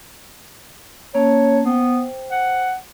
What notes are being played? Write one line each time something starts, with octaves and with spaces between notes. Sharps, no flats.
A#3 C#4 C#5 A5
B3 C5 G5
F#5